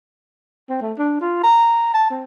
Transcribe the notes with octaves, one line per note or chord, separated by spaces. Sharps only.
C4
A3
D4
F4
A#5
A5
C4